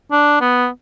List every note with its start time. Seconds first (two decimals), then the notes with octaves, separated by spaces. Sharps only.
0.12 D4
0.41 B3